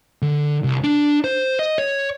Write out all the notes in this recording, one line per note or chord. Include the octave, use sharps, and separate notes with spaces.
D3
C2
D4
C5
D#5
C#5